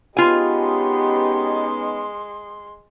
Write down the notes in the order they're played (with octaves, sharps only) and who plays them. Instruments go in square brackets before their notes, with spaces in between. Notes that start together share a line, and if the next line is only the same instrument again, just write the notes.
[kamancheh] G#3 C6 [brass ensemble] B3 C#4 D#4 [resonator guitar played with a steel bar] F4 G#5 [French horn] G4